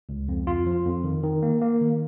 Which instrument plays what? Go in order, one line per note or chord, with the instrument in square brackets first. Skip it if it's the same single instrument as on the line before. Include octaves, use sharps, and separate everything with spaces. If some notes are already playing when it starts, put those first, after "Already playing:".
[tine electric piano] C#2
F2
F4
F3
F2
D#3
D#3
A#3
A#3
D#3